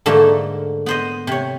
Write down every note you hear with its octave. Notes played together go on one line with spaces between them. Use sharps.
G#2 D3 A3 A#3
B3 C5 D#5
C3 C#5